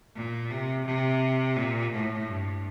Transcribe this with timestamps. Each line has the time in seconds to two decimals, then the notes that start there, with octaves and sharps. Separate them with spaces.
0.15 A#2
0.51 C3
0.86 C3
1.56 A#2
1.92 A2
2.27 G2